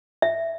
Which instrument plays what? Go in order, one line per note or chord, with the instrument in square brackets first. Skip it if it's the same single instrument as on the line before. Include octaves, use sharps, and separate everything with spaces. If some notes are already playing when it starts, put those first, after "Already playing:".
[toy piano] E5